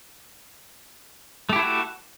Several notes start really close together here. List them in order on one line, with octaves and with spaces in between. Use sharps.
A3 G4 E4 A4 F#4